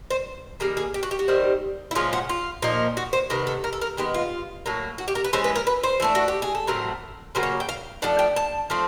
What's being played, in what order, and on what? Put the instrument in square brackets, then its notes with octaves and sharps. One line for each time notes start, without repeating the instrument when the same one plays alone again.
[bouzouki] C5
D#3 G3 A#3 G#4
G#4
G4
F#4
G4
F#4
D#3 G3 C4
E4
A#2 F3 G#3 C#4 F4
F#4
F4
A#2 F3 A#3 D#4
F#4
C5
C3 D#3 B3 A#4
A4
A#4
A4
A#4
D#3 G#3 B3 G4
F4
A2 F#3 A#3
F#4
G4
A#4
B4
E3 G#3 C#4 C5
B4
A#4
B4
C5
E3 A3 D4
F#4
G4
G#4
A4
A2 F#3 A3 C4 A#4
C#3 F#3 A#3 C5
C#5
G5
F5
F3 A3 D4 F#5
G5
A5
F3 A3 C4